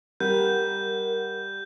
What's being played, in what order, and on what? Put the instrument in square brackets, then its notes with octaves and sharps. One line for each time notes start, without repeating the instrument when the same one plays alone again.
[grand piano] G3 [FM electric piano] A#4 F#5 [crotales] G6